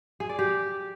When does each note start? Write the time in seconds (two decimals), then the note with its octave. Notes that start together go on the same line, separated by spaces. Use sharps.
0.20 G#4
0.29 D5
0.39 G4